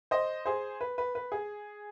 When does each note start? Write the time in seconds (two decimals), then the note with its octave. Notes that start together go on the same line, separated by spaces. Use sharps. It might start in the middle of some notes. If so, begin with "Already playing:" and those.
0.11 C5 D#5
0.46 G#4 C5
0.81 B4
0.98 B4
1.15 B4
1.32 G#4